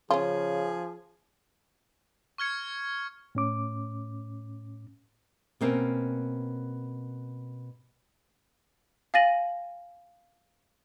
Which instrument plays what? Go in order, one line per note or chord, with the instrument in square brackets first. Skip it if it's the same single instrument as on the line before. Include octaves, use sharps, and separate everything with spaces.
[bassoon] C#3 [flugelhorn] F3 [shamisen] C#4 F4 [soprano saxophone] G#4
[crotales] C#6 F6 G#6 C#7
[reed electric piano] A2 C#4 D6
[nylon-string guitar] B2 A#3 C4 C#4
[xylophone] F5 G#5 A6 A#6 D#7 F#7